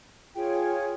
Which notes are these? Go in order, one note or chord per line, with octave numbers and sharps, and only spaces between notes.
F4 G#4 C#5 G5